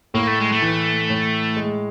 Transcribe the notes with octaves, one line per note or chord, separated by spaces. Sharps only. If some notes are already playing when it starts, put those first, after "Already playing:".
A2 A#3
A3
G#3
A3
E3
A2
G#3